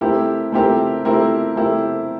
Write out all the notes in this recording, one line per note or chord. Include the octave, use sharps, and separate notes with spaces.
A3 C4 E4 G4 A#4
A3 C4 E4 G4 A#4
A3 C4 E4 G4 A#4
A3 C4 E4 G4 A#4